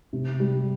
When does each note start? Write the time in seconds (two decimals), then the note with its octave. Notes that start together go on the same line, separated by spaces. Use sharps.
0.13 C3
0.40 G3